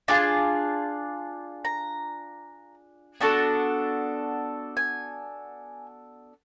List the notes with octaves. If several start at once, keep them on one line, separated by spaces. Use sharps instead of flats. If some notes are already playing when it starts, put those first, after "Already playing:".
D4 F4 G#4 A5
A#5
B3 D4 F#4 A4 A5
G#5